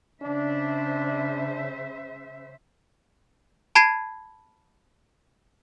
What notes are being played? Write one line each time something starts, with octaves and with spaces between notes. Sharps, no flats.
C#3 D4 C5 E5
A5 B5 G#6 C7 D#7